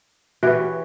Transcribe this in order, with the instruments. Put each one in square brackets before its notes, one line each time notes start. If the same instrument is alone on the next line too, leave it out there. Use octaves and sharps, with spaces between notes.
[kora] E3 G4 C#5 [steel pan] F#4 B4